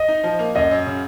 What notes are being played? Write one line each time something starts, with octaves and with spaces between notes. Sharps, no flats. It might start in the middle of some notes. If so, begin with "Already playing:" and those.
Already playing: D#5
D#4
F3
A#3
F#2 D#5
F#2
C#3